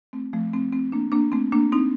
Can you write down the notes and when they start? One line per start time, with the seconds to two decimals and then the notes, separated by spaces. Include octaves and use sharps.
0.13 A3 C4
0.33 F3 A3
0.54 A3 C4
0.73 A3 C4
0.92 A#3 D4
1.12 A#3 D4
1.32 A3 C4
1.52 A#3 D4
1.72 C4 D#4